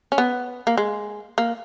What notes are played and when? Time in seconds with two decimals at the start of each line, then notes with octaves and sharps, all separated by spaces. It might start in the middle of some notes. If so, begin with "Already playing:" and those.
0.12 C#4
0.18 B3
0.67 A#3
0.77 G#3
1.38 A#3